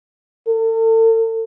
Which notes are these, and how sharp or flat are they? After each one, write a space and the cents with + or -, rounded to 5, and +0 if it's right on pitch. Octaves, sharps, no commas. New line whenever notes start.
A4 +40